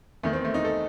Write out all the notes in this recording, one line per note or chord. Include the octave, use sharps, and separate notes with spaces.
E2 D#3 A3
C4
A3
D#4
A4